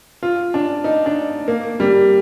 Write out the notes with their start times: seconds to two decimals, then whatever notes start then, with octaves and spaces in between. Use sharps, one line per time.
0.23 F4
0.54 D4
0.84 D#4
1.06 D4
1.48 A#3
1.80 G3